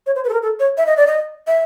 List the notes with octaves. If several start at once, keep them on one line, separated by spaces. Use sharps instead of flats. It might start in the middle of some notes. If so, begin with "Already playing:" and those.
C#5
C5
B4
A4
A#4
A4
C#5
E5
D#5
D5
D#5
E5